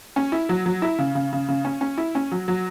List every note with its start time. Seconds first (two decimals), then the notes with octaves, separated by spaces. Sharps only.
0.16 C#4
0.32 E4
0.49 F#3
0.66 F#3
0.82 E4
0.98 C#3
1.15 C#3
1.33 C#3
1.48 C#3
1.65 C#4
1.81 C#4
1.98 E4
2.15 C#4
2.32 F#3
2.48 F#3